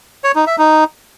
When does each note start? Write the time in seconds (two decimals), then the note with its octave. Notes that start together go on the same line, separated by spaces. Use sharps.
0.24 C#5
0.35 D#4
0.47 E5
0.58 D#4